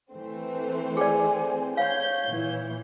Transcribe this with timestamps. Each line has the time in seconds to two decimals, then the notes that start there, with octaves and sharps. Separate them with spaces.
0.11 E3 A3 C4
0.97 G#4 D5 G#5
1.77 C#5 F5 F#5 G6
2.26 A#2 E3